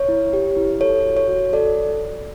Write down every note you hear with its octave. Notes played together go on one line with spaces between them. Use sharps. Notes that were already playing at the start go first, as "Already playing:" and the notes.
Already playing: C#5
E4
G4
E4
A4 C#5
F#4
C#5
F#4
A4 D5